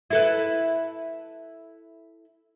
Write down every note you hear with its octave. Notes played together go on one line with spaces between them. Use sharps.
E4 A4 B4